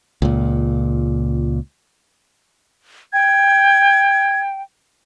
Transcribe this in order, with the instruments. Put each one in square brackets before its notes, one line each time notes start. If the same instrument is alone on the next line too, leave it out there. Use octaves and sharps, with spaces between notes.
[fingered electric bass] C#2 A#2
[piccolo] G5 [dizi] G#6